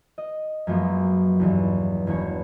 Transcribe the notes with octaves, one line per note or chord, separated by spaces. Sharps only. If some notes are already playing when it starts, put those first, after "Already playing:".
D#5
F#2 F3 F#3 G#3 A#3 B3
B1 E2 G2
E1 E2 A#3 C#5